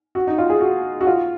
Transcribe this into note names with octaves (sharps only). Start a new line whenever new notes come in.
F#4
D#4
F4
G#4
F#4
F#4
F4